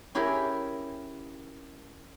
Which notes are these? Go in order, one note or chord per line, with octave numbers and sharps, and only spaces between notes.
C#4 E4 G4 G#4 A#4